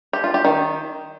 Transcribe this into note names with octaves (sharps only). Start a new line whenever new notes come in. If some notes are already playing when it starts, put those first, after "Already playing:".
G4
F4
G4
D#3